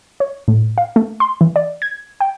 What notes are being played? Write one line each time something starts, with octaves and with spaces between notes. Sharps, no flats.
C#5
A2
F5
A3
C6
E3
D5
G#6
G5